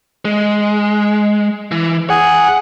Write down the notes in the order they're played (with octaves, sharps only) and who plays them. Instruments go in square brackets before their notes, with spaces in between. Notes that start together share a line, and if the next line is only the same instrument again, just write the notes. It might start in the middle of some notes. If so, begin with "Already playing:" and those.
[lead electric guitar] G#3
E3
[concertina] G#4 G#5 [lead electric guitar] F#5